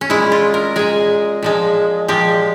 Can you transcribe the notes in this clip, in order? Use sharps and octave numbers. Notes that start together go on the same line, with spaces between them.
C#4
A#2 G#3 E4
F4
A#4
A#2 G#3 G#4
A#2 F3 G#3
A#2 F3 G#3 G4